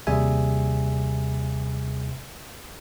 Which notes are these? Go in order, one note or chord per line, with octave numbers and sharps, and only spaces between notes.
D#2 C3 G3 G#4 E5 G#5